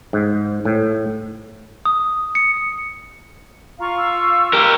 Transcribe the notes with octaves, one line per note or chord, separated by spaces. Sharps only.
G#2
A2
D#6
C#7
F4 F5 A#5 C#6
E6
G4 A#4